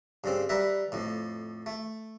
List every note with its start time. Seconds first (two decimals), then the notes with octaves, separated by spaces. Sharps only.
0.24 G2 C#3 C4
0.49 G3 A#4 B4 E5
0.92 F2 A2
1.66 A3